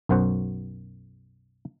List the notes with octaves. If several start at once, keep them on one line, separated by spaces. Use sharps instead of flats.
B1 F#2 F#4 C5 F#5